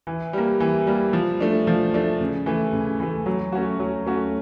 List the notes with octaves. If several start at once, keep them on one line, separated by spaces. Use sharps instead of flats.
E3
G3 A#3
E3
G3 A#3
F3
A3 D4
F3
A3 D4
C#3
E3 A3
C#3
E3 A3
F#3
A3 C#4 F#4
F#3
A3 C#4 F#4